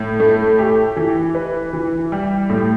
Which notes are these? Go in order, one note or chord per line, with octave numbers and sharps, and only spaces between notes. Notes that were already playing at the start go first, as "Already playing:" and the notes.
Already playing: A2
A3
G4
E3
B4
E3
G3
A2